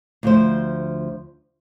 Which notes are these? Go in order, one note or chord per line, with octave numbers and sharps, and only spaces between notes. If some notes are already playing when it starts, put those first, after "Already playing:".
D2 F3 C5